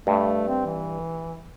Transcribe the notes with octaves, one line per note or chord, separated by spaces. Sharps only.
G2 A3
C4
E3